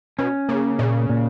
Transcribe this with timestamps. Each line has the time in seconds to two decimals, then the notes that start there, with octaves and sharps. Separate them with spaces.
0.18 B2 C#4
0.49 C#3 A#3
0.79 A#2 C#3
1.10 A#2